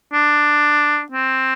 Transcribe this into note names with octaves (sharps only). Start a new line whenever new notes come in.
D4
C4